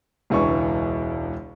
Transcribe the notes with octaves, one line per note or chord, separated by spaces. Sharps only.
E1 C#2 E3 D4 C#6